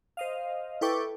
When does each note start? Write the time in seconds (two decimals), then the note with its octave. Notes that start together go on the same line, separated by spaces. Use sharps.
0.17 C5 D#5 F5
0.81 E4 A4 B4 G5 C#6 D6